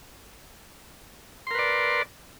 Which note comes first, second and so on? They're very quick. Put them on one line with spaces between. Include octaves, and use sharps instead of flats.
C6 A#4 B4 D5